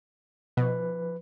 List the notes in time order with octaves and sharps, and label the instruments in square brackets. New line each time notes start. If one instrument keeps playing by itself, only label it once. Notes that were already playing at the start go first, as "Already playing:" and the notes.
[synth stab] B2 [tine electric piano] F3 B4